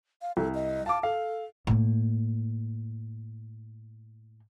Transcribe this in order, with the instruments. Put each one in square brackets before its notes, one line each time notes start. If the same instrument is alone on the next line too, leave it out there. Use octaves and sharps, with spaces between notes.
[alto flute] F5
[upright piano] C2 [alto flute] A4
[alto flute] D#5
[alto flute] F5 [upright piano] A5 D6
[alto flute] A4 [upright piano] F5
[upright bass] A2 A#3